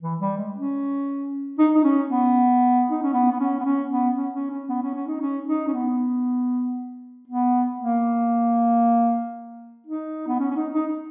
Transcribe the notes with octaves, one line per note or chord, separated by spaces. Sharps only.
E3
G3
G#3
C#4
D#4
D#4
C#4
B3
D#4
C#4
B3
B3
C#4
B3
C#4
B3
C#4
C#4
C#4
B3
C#4
C#4
D#4
C#4
D#4
C#4
B3
B3
A#3
D#4
B3
C#4
C#4
D#4
D#4